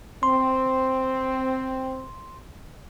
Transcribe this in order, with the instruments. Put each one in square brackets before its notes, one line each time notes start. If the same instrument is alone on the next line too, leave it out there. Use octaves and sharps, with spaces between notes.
[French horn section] C4 [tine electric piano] C6